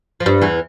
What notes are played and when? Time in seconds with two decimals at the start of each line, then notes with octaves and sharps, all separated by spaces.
0.20 F3
0.26 G2 G3
0.41 E2 E3